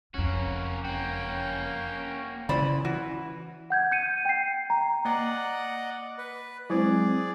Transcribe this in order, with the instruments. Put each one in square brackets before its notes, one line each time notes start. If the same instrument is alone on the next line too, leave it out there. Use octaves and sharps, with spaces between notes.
[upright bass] F#1 F2 [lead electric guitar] A#3 F#4 [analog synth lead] C#4
[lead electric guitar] A#3 F#4 [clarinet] G5
[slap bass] C#3 E3 [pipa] C5 D5 B5
[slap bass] E3 [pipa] F#4
[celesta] F#5 G6 G#6
G6 C#7 D#7
G5 C7
A#5
[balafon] A#3 A#5 [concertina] D5 D#5 F#5
[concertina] B4
[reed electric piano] F#3 G#3 C4 [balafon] E4 C5 [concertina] G#4 D5